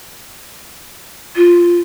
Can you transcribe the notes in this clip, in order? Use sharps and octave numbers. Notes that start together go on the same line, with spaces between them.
F4